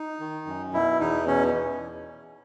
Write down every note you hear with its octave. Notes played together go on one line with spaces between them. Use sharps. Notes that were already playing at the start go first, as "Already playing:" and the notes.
Already playing: D#4
D#3
F#2
B2 E4
E2 D#4
B2 C#4